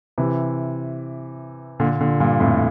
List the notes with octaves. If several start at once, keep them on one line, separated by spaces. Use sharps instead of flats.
C3 E3
A#2 D3
A#2 D3
G2 A#2
F2 A2